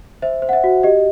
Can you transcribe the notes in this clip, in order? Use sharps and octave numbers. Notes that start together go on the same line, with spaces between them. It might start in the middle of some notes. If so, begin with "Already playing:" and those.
C5 E5
C5
F#5
E5
F#4
G4 D#5